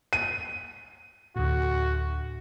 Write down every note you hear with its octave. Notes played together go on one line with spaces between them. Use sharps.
D#7
D2 A2 F#4